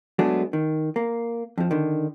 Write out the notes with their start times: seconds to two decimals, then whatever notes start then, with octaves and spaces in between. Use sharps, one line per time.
0.19 F#3 G#3 A3 B3 D4 G#4
0.53 D#3
0.96 A#3
1.58 F2 F3
1.71 D3 D#3